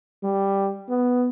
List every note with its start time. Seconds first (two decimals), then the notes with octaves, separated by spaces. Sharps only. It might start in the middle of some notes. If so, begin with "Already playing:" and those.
0.24 G3
0.89 B3